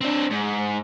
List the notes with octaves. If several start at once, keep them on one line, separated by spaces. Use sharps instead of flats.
C4 D4
G#2